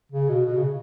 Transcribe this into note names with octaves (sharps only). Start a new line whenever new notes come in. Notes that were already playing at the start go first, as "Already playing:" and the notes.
C#3
B2
B2
C#3